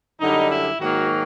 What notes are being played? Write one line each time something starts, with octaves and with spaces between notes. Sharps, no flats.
F#2 D3 G3 D#4
E4
G#2 D#3 F#3 A#3 F#4